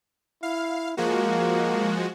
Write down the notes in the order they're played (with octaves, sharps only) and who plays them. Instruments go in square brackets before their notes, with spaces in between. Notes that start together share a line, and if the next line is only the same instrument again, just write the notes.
[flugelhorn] E4 [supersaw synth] F5
[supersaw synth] F3 G#3 F#4 [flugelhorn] A#3